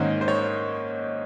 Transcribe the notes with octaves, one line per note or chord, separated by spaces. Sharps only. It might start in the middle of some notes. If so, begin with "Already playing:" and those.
Already playing: G#2 D#3 A#3 C#4 C5
C5
C#5